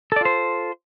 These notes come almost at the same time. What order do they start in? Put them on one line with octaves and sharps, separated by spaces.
A4 D5 F4 C5